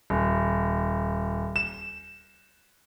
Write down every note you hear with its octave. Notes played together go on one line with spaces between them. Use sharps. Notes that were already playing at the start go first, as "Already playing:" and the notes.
D#1
E7